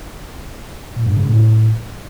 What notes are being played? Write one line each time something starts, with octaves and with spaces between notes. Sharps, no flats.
A#2
G2
C#3
A2